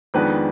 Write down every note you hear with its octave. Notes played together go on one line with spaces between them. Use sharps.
F2 D#3 G#3 B3 D4 B4